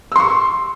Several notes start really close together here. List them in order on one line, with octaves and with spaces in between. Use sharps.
E6 C6 C#6